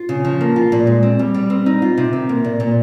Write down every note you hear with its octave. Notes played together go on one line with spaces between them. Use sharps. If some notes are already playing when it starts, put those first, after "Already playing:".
Already playing: F4
C#3
F3
A#3
F4
A#2
G#3
C4
G3
G3
C4
D#4
F4
C3
D#3
A#3
A#2
A#2